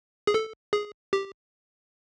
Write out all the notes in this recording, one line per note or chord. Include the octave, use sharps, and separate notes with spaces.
G#4
A4
G#4
G4